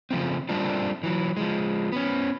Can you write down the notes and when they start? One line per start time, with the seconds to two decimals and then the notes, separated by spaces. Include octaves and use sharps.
0.11 C#3 F3 A3 C4
0.49 G3 A3 A#3 C4 D4 F4
1.03 E3 F#3
1.37 F3 G#3
1.92 B3 C#4